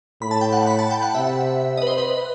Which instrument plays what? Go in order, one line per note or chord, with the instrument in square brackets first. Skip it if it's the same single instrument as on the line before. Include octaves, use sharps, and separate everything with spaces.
[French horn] A2 [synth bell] B5
[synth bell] A5
G5
F#5
B5
A5
G5
F#5
[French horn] C3 [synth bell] E5
[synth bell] D#5
B4
C5
B4